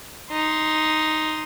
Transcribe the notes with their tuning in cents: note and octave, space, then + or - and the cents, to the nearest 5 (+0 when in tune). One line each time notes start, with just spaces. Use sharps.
D#4 +0 C6 +0